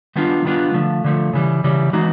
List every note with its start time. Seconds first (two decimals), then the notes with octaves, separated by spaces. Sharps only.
0.16 D#3 G3 B3 D4 F4
0.45 D#3 G3 B3 D4 F4
0.74 D3 F3 A3
1.05 D3 F3 A3
1.33 C#3 E3 G3
1.64 C#3 E3 G3
1.93 E3 G#3 B3 D#4 F#4